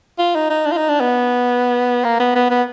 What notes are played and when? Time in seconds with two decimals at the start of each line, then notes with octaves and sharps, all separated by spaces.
0.19 F4
0.35 D#4
0.50 D#4
0.65 D4
0.72 F4
0.77 D#4
0.89 D4
1.00 B3
2.04 A#3
2.19 B3
2.35 B3
2.50 B3